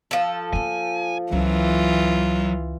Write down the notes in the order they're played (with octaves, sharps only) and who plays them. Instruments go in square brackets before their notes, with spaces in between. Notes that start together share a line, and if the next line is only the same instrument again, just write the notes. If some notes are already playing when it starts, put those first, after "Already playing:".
[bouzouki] F3 A4
[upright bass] A#3 F4 [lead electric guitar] G#5
[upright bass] C#2 [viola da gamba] E3 F4 [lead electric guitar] F#3